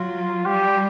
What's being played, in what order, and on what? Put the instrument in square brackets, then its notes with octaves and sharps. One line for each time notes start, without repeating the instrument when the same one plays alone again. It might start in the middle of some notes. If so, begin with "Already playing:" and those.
Already playing: [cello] F#3 [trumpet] F4
[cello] G3 [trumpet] G4